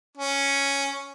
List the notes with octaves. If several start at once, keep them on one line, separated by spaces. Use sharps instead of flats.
C#4